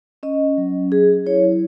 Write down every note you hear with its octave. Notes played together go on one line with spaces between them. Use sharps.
C#4 D#5
F#3
F#3 G#4
E4 C#5